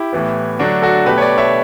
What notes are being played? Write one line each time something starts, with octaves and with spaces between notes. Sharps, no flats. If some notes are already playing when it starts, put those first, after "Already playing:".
Already playing: E4 G4
A2 E3 B3
D3 F#3 A3 D4 F#4
F#4 A4
B2 A3 G4 B4
C#5
B4 D5
C#5 E5